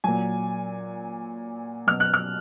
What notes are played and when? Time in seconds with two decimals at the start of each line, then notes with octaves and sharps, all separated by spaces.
0.04 A#2 F#3 G#5
1.87 B2 F#3 F6
2.00 F#6
2.14 F6